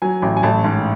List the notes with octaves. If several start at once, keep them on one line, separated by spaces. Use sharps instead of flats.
F#3 G#5
A1
G#5
A1 A5
G#2